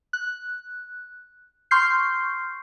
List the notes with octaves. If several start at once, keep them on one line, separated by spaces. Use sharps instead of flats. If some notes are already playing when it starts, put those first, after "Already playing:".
F#6
C6 C#6 F6 G6 C7